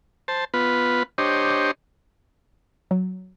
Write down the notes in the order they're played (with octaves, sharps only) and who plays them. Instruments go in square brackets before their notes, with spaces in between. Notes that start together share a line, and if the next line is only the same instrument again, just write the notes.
[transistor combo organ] C5 A5
B3 F4 B4
D4 G4 C5 C#5 D#5
[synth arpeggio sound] F#3